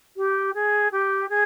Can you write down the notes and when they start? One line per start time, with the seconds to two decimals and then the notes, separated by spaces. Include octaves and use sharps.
0.16 G4
0.54 G#4
0.91 G4
1.29 G#4